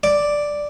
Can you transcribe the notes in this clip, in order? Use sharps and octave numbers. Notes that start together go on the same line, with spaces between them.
D5